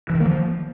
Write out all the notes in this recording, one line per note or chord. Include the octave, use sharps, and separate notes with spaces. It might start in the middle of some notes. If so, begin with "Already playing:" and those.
E3
D#3
A#3
F3